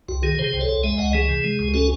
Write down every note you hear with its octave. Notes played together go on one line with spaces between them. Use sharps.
C2 F#4
D#3 G#4
C3 G#4 C5
C2
A4 C#5
C2
G#3 E5 G#5
C#2 D#5 F#5
E3 G#4
C3
G#3
C#2
C#4 F#4 A4